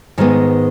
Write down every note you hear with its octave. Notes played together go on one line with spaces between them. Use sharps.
G#2 D#3 G#3 B3